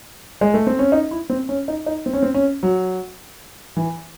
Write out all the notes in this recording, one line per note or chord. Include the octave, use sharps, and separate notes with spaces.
G#3
A3
C4
C#4
D#4
E4
C4
C#4
D#4
D#4
C4
C#4
C4
C#4
F#3
E3